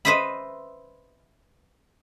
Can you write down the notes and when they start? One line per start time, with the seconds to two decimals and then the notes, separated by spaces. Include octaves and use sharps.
0.05 B4 C5 D#5 E5 B5